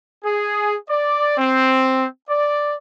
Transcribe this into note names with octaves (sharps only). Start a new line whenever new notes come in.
G#4
D5
C4
D5